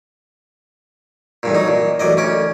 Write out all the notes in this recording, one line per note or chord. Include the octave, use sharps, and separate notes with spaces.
A1 G2 A#2
F#3 D#4
A#2
A1 F#2 D5 D#5
D2 C#4 D6